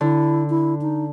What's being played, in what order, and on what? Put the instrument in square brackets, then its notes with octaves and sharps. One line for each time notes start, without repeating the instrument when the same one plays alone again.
[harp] D3 [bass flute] E4
[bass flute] E4
D#4